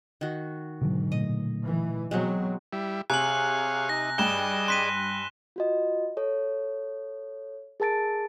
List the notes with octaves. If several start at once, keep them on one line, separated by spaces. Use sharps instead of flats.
D#3 F#4
G#2 B2 D3 F#3
A#2 A3 D#5
E3
B2 F#3 G#3 C4 F#4
G3 E4
C3 G#4 C#5 F5 G#5 F#6 F#7
D#4 A#6
G2 G#4 D5 D#5 G5 E7 G7
C6 F#6 B6 D#7
F4 F#4 D#5
A4 C#5
G#4 A#4 A5 A6 D7